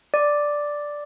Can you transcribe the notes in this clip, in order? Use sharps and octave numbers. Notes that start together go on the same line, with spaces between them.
D5